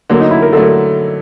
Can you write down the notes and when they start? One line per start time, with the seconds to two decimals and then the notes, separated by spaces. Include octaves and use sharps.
0.10 D3 F#3 A3 A#3
0.20 D#4
0.31 E4
0.42 A#4
0.52 D3 F#3 A3 A4
0.63 A#4